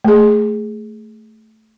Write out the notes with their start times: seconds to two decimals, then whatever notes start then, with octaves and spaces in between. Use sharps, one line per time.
0.05 A3 G#4